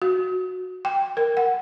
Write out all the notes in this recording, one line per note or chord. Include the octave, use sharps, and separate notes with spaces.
F#4
G5
A#4
F#5